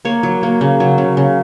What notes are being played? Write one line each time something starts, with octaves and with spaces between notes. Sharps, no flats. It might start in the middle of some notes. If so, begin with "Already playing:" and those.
A#3 C#5
F#3
A#3
C#3
F#3
C#3
C#3